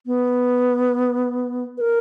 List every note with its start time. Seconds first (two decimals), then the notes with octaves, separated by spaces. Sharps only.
0.06 B3
1.77 B4
1.81 A#4